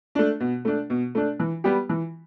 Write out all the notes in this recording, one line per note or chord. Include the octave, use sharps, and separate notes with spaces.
A3 D4
B2
A3 D4
B2
A3 D4
E3
G3 B3 G4
E3